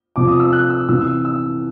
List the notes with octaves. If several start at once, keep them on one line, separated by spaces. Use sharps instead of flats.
C3 F3 D6
D#6
E6
F#6
E6
C3 E3 E6
E6
E6